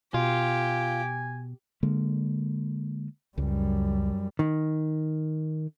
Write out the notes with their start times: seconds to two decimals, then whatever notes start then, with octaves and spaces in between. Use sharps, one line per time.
0.14 B2 F4 G4 G#5
1.83 D3 G#3 A#3
3.38 C#2 F#2 G3
4.39 D#3